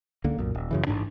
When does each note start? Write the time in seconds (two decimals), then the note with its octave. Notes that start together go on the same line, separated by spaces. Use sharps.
0.24 C#2 D3 A#3
0.38 B1 F#2 A#2
0.55 D#1
0.71 F#2 C#3 E3
0.87 A1 G#2 B2 D4